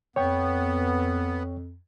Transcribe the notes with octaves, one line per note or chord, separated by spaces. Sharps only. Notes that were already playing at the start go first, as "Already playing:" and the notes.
F2 B3 C#5 G5 C#6